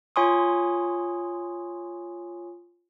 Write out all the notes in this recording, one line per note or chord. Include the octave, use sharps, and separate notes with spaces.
F4 C#5 G#5 C6 C#6 D#6